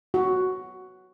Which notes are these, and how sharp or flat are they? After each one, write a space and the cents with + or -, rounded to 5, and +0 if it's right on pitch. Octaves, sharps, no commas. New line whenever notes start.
F#4 +5